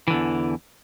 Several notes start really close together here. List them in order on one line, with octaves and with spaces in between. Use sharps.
E3 D3 E2